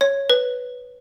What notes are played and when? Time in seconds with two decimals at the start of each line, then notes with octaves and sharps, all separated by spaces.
0.01 C#5
0.30 B4